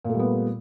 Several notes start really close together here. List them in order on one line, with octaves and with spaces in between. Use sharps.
A#2 A3 G3 B3